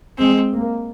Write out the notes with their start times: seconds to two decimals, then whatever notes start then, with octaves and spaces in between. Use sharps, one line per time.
0.19 G#3 C4
0.53 A#3